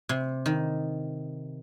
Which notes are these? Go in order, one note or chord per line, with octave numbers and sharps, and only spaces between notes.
C3
D#3